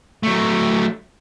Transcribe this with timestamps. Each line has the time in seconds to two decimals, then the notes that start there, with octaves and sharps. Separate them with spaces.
0.23 F#3 A3